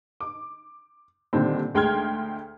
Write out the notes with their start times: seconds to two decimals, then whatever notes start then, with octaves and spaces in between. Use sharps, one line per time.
0.21 D6
1.33 A#2 D3 D#3 G3 C4
1.74 D2 G#3 G5 C6 F6 G#6